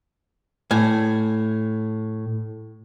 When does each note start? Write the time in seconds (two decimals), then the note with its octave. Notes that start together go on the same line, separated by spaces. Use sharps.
0.71 A2 G#5